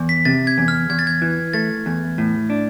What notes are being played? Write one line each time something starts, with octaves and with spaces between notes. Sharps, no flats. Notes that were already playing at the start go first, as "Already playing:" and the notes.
Already playing: E2
B6
C3 A6
G#6
E2
F6
E2 G#6
A6
G#6
E3
A3 A6
E2
A2
D4